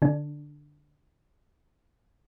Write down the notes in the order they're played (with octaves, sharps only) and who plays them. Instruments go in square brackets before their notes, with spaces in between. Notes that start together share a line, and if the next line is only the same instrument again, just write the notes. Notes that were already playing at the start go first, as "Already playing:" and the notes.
[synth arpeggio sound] D3 D4